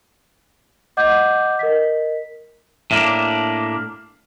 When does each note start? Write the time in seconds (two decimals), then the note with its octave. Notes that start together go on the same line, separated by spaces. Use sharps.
0.97 D#5 F#5 D6 G6
1.59 A#4 D#5 B6
2.91 A2 A#3 D4